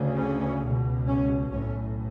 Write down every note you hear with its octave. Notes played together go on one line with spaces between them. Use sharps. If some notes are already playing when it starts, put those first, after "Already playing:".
Already playing: D2 C#3
C#4
C#2 B2
C#4
B1 A2 C#4